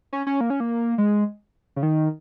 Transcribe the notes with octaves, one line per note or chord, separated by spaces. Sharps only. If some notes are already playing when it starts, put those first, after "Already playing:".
C#4
C#4
A#3
C#4
A#3
G#3
C#3
D#3